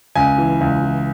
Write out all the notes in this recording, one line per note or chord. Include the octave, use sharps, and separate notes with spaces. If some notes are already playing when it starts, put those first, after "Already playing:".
C#2 G#5
E3
C#2
E3